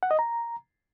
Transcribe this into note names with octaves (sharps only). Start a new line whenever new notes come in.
F#5
D#5
A#5